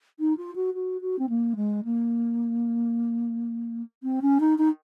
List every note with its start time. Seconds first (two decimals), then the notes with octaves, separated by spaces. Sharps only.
0.19 D#4
0.37 F4
0.55 F#4
0.74 F#4
1.01 F#4
1.18 C4
1.29 A#3
1.56 G#3
1.84 A#3
4.03 C4
4.22 C#4
4.40 D#4
4.58 D#4